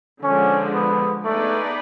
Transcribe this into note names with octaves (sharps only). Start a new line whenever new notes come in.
D3 F3 G#3 C#4
B3
A3 B3 D#4 G#4 B4 D5